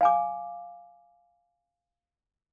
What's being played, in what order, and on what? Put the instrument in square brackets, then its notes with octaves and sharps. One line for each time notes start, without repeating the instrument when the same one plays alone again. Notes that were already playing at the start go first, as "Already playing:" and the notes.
[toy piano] F5 G#5 D6